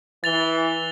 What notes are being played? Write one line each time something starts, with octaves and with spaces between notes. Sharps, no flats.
E3 A6 F7 G7